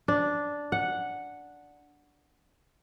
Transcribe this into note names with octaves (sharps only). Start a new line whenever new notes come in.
D4
F#5